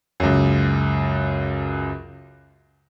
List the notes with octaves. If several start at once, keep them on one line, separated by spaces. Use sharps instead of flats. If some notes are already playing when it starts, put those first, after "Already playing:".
C#2 F#2